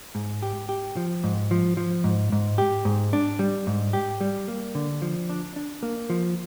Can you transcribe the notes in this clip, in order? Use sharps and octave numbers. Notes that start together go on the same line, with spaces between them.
G#2
G4
G4
F3
G#2
F3
F3
G#2
G#2
G4
G#2
D4
G3
G#2
G4
G3
A#3
D3
F3
D4
D4
A#3
F3